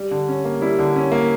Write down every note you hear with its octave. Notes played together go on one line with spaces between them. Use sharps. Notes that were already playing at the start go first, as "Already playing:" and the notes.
Already playing: G3
D3
C#4
A#3
G3 E4
D3
C#4
A#3